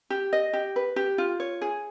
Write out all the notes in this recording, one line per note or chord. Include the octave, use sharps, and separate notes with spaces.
G4
D#5
G4
B4
G4
F4
C#5
G#4